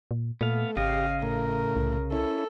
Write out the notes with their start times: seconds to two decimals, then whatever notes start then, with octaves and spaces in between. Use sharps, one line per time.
0.11 A#2
0.41 A#2 A3 B3 F5
0.77 G#1 C#3 G4 D#5 F5
1.22 A2 A#4
1.76 C2
2.12 C#4 E4 A4